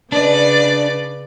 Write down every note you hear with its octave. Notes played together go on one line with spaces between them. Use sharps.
C#3 D4 B4 D5